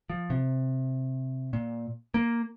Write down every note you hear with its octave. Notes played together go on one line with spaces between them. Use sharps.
F3
C3
A#2
A#3